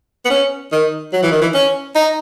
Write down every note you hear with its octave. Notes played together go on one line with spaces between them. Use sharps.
B3
C#4
D#3
F#3
E3
D#3
E3
C#4
D#4